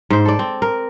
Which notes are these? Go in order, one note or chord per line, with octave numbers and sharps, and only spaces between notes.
G#2 C5
A4 D5
C4
A#4